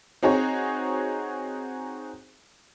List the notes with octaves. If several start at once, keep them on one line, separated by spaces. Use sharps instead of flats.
C4 D#4 F#4 G#4 C#5